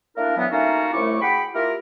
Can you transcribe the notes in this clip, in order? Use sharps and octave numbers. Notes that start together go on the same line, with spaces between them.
A3 A#3 D4 E4 A#4
D3 E3 F#3 B3
A3 A#3 C#4 D#4 F4 F#4
C2 F#2 A3 E4 C#6 D6
F#4 G#4 G5 B5
A#3 E4 F4 G4 A#4